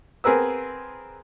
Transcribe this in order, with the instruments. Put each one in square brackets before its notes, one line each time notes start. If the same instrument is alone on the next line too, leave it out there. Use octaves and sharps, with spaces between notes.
[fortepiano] B3 C4 G#4 A#4 B4 E6